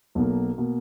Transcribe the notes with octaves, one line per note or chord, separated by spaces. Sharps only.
B1 B2 A#3
B2 A#3